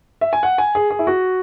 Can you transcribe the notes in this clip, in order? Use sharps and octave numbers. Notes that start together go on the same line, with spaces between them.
E5
G#5
F#5
G#5
G#4
G#4
E4
F#4